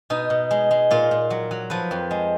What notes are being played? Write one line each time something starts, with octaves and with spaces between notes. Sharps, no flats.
B2 D#4
B2
G#3
G#3
A#2 F4
A#2
F#3
F#3
F3 B4
F2
G#3